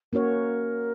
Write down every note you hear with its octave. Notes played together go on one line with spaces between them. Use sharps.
A#3 C#4 F#4 A#4 C#5